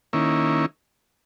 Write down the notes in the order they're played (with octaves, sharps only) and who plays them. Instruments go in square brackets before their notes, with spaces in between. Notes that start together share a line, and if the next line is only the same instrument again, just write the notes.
[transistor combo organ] D#3 A#3 C#4 E4